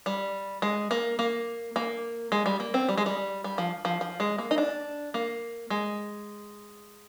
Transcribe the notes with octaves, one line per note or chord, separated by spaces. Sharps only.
G3
G#3
A#3
A#3
A#3
G#3
G3
A#3
C4
G3
G#3
G3
G3
F3
F3
F3
G#3
A#3
D#4
D4
A#3
G#3